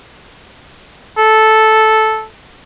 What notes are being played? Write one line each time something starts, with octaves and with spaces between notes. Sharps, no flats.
A4